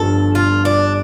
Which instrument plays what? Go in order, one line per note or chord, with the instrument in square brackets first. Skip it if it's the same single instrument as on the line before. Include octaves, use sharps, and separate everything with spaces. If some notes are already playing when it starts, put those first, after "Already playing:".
Already playing: [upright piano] G1 G2 F3 [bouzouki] A4
[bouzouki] F4
D4